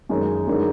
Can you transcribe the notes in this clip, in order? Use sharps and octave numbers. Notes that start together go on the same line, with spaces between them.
F#2 D#3 G#3 D#4
F#2 D3 G#3 D#4 A#4